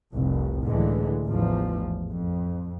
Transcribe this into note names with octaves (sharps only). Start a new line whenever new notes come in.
F1 C2
C#2 A2 D3 E3 G#3
A1 E2 G#2 F3
F2